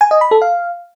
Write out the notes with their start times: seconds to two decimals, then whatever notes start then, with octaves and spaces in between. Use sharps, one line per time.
0.01 G#5
0.11 D#5
0.21 B5
0.31 A4
0.42 F5